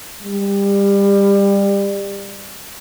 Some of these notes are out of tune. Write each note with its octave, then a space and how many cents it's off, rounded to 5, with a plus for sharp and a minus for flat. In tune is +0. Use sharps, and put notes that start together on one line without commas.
G3 +25